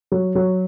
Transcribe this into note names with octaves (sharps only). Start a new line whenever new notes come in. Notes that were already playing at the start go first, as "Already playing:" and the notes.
F#3
F#3